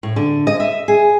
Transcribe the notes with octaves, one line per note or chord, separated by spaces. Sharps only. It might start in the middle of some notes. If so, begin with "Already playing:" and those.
A2
D3
D#5
E5
G#4